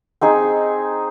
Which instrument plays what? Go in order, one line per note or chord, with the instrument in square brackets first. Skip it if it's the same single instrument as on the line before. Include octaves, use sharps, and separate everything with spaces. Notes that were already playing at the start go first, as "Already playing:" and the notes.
[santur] C4 D#4 G#4